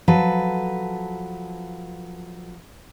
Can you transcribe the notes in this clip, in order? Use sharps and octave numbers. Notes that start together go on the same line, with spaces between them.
F3 F#3 A4 B4